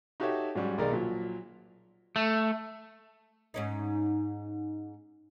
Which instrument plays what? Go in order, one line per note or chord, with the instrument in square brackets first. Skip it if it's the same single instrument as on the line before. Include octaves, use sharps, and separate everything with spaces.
[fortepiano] D#4 F#4 G4 A4 C#5 E5
G#2 F#3 G3 C#4
B1 D#3 G#3 A#4 D5
A#2 F3 F#3
[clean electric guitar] A3
[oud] G#2 C#4 D#4